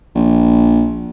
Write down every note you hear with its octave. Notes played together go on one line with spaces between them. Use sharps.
A#1